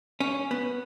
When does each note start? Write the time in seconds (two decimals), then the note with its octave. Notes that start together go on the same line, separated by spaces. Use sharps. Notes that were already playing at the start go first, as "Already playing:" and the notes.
0.20 C#4
0.51 B3